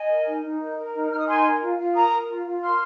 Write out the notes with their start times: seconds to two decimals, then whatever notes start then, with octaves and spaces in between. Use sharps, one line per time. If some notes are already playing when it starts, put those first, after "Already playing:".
Already playing: D#5 G#5
0.09 A#4
0.25 D#4
0.43 D#4
0.60 A#4
0.76 A#4
0.94 D#4
1.11 D#4 F6
1.19 D#6
1.27 A#4 G#5 C6
1.44 A#4
1.61 F4
1.78 F4
1.94 A#4 A#5 D#6
2.11 A#4
2.28 F4
2.45 F4
2.62 A#4 C6 F6